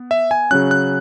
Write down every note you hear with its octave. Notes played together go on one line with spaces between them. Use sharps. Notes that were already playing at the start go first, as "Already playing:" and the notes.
Already playing: B3
E5
G#5
C#3 F#3 C#4 F#6
F#6